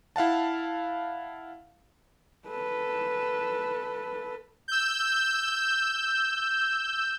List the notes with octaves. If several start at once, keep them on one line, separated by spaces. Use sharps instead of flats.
E4 F5 F#5 A5
A4 B4
E6 G6